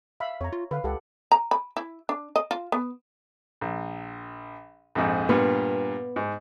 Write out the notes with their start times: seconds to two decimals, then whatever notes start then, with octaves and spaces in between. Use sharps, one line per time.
0.20 E5 F5 B5
0.41 F2 C#5 A#5
0.52 F4
0.71 D3 B4 F5
0.84 C#2 G4 A4 F#5
1.32 A#5
1.51 B5
1.77 E4
2.09 D4
2.36 D#5
2.51 F4
2.72 B3
3.61 A#1
4.95 A#1 F2 G#2
5.29 G2 A#2 B3
6.16 G#2